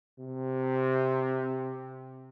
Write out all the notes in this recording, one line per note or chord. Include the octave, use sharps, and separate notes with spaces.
C3